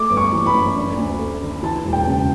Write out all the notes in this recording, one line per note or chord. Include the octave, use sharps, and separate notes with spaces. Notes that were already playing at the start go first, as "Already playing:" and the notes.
Already playing: A3 D6
G1
C#6
E3
B5
F#2
D4
D2
A3
D3
E3 A5
E1
G5
C#3